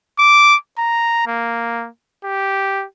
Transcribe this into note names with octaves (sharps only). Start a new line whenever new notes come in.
D6
A#5
A#3
G4